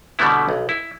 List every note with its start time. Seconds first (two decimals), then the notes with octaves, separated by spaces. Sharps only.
0.19 B2 D3 G3 A3 B3 E4
0.49 B1
0.69 E4